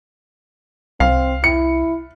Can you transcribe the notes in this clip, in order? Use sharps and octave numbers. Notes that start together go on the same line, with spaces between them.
C2 C4 F5
E4 C#7